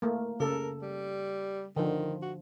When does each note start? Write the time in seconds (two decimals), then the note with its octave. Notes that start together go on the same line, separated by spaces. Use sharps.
0.02 A3 A#3
0.40 C#3 A4 A#4
0.82 G3
1.76 D3 D#3 F3
2.22 F#4